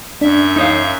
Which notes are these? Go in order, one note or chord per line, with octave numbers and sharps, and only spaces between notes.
F#2 D4 E5
D#4 C#5 F5